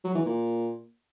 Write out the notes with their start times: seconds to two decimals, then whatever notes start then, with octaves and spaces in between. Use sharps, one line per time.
0.04 F#3
0.15 E3
0.25 A#2